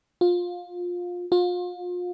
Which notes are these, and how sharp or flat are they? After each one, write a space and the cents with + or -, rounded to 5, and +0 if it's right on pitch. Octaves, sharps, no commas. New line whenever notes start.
F4 +20
F4 +35